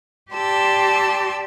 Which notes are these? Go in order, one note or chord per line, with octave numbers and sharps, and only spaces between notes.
G4 D5 A5 C6 E6